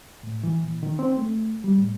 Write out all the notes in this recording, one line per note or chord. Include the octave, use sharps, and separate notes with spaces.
A2
E3
A#2
D#3
C4
A3
G3
A2